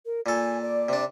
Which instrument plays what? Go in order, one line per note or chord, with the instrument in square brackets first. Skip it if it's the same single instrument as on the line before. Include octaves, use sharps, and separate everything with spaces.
[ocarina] A#4
[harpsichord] A#2 A4 [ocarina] G#5
[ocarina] D5
[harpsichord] C3 D4